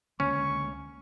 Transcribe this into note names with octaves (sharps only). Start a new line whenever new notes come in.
C#2 D3 A#3 C#4 C#6